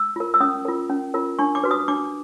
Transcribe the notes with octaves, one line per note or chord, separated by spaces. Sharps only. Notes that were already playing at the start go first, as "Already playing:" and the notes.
Already playing: E6
F4 A#4
E6
C#4 D#6
F4 A#4
C#4
F4 A#4
D4 C#6
D6
F#4 B4
D#6
D4 D6